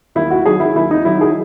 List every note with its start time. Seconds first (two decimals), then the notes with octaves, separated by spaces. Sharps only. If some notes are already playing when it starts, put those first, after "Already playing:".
0.15 D#2 E4
0.30 F#4
0.46 D#3 F#3 G#4
0.60 E4
0.75 D#2 E4
0.91 D#4
1.05 D#3 F#3 E4
1.21 G#4